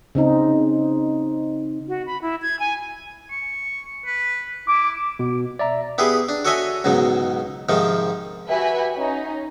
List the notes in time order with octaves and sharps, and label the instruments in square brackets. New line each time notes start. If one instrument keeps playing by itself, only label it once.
[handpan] C#3 C4 D#4
[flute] F#4
B5
E4
G#6
G#5
[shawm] C#6
B4
[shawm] E4 [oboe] D6
[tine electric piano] B2
D5 E5 A#5
[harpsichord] B3 E4 G4 G#4
D4
F#4 A4 C#5 D#5 E5 G#5
C#2 G#2 B2 F#3
G#2 C3 D#3 F3
[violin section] F#4 G4 B4 E5 F#5 G#5
C#4 D#4